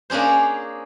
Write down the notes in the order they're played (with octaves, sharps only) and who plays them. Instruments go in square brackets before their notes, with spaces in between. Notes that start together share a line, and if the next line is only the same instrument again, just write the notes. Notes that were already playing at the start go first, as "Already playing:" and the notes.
[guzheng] A#3 C#4 D4 G#4 C5